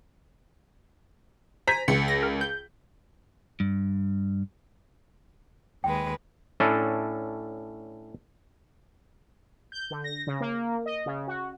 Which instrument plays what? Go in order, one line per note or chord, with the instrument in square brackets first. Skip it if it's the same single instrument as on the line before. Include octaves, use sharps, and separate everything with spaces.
[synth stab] C5 G#5 [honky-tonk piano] A#5 B6
[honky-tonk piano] C#2 [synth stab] C#7
[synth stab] A#6
A#4
G6
[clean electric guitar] G2
[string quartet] D#2 G#3 B4 [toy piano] G5
[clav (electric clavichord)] A2 C#4 D4 A4
[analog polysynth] G6
D3
A#6
C#3
A#3
D#5
C#3
F#4